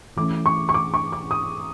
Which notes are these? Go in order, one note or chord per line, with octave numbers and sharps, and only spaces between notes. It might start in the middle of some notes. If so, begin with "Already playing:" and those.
E3 A3 C#4 D6
C#6
C#6
D6
C#6
D6
D#6